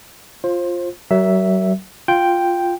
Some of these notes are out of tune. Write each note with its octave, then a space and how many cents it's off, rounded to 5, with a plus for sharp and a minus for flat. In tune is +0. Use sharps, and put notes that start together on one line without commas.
F4 +0 C5 +25
F#3 +35 A#4 +0 E5 +0
F4 +0 G5 +0